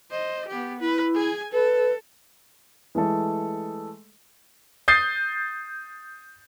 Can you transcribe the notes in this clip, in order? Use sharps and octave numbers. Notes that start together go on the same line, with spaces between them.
C5 D#5
B3 G4
E4 B4
G#4 G#5
A4 B4
E3 G#3 A3 A4
D#6 G6 A6 C7